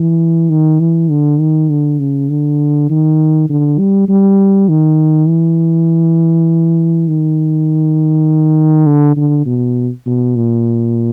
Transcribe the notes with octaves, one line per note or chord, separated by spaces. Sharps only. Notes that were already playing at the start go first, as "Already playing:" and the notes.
Already playing: E3
D#3
E3
D3
D#3
D3
C#3
D3
D#3
D3
G3
G3
D#3
E3
D#3
D3
D3
B2
B2
A#2